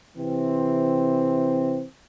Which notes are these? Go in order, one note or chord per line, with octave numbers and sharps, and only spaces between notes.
C3 E3 C4